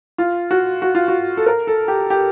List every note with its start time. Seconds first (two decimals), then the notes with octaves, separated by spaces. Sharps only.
0.18 F4
0.51 F#4
0.82 F#4
0.95 F4
1.08 F#4
1.37 A4
1.46 A#4
1.67 A4
1.88 G4
2.10 G4